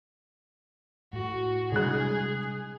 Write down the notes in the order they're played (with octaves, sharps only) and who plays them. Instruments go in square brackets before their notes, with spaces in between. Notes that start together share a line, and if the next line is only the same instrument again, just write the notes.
[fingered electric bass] A2 [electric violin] F#4
[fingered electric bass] C3 G3 D4 [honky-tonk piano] G#3 F#6 [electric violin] G#4